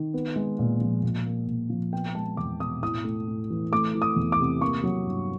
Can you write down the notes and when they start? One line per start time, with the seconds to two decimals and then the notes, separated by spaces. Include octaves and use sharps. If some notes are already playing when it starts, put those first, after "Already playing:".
Already playing: D#3
0.14 B3
0.36 G#3
0.59 A#2
0.81 F3
1.03 A#2
1.26 A#3
1.47 A#2
1.70 F3
1.93 B3 G5
2.15 G#3 A5
2.37 E2 D6
2.60 B2 D#6
2.82 A2 D#6
3.04 A3
3.28 A2
3.50 E3
3.72 A3 D6
3.95 E3
4.02 D#6
4.16 E2
4.32 D6
4.39 C3
4.61 A#3 C#6
4.83 F#3
5.06 G2